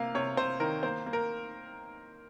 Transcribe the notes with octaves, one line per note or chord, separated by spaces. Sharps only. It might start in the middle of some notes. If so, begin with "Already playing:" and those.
Already playing: C3 A#3 F5
C3 C#5
C3 C5
D#3 A#4
A#3 C5
A#3
A#4